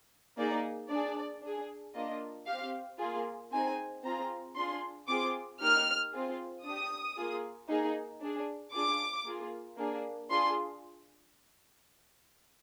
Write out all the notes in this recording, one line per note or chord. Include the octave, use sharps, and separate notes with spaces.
A#3 D#4 G#4 D5
D4 G#4 D5
D4 G#4
A#3 D4 F4 D#5
G4 F5
C4
A#3 F4 G#4
C4 D#4 G#4 G#5
C4 F4 G#4 A#5
D4 F4 G#4 C6
C4 F4 G#4 D6
A#3 D#4 G4 F6
C4 F4 G#4
D4 G4 D#6
A#3 F4 G#4
A#3 D#4 G#4
D4 G#4
D4 F4 G#4 D6
A#3 F4 G#4
A#3 D4 G#4
D4 F4 G#4 C6